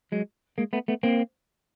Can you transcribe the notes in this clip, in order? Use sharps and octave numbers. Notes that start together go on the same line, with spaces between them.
F#3 G#3
G#3 A#3
A3 B3
A3 B3
A#3 C4